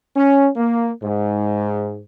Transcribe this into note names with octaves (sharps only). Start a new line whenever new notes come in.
C#4
A#3
G#2